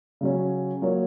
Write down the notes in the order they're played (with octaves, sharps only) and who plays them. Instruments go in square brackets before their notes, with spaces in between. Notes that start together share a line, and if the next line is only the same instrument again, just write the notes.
[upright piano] C#3 F#3 C#4
F#3 A#3 F4 A#4 C#5